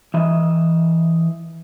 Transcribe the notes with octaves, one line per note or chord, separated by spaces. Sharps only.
E3 D#5 E5